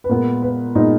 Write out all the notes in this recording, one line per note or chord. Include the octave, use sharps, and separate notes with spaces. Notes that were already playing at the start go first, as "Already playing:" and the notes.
B4
A#2 G#3 B3 A#4
B4
A#2 G#3 B3 D#4